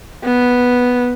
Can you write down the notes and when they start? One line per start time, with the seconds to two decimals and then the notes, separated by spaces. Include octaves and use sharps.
0.24 B3